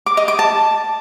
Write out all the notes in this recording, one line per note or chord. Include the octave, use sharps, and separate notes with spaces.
D6
D#5
D6
A5